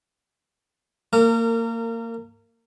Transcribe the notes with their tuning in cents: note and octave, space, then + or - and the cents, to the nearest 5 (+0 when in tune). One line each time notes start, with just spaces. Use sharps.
A#3 -25 A#4 -35